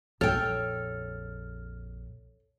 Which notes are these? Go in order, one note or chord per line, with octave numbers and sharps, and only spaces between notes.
A#1 F2 A4 C#5 G5 F6